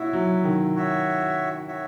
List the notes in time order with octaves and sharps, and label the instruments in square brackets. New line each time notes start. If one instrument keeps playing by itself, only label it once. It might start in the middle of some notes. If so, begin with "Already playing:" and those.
Already playing: [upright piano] E4 [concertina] F#4 C#5 E5
[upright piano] F#3
D#3
[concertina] F#4 C#5 E5
F#4 C#5 E5